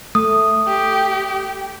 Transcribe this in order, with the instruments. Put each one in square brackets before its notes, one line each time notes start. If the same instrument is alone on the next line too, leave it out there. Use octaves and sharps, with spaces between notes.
[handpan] A3 [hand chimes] D#6
[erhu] G4